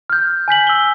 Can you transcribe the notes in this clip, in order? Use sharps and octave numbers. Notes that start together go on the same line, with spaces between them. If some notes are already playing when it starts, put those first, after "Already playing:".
F6 G6
G#5 G6 B6 F#7
E6 G7